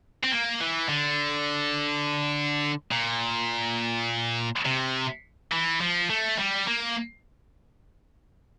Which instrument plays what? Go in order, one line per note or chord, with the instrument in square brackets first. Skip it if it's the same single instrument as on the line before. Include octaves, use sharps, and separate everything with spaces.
[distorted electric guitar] C4
A#3
E3
D3
A#2
C3
E3
F3
A3
G3
A#3